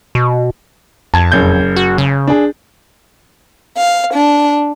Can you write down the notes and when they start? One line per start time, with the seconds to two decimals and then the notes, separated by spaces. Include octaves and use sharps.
0.15 B2
1.14 F2 A5 G#6
1.32 F#1 G6
1.76 F#4
1.98 C#3
2.28 D4 G#4
3.78 F5
4.15 D4